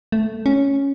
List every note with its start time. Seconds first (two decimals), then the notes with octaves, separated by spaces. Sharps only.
0.12 A3
0.46 C#4